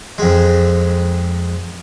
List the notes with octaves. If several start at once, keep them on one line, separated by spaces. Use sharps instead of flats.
F2 G#3